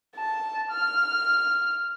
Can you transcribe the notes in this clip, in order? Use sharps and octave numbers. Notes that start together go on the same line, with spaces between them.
A5
F6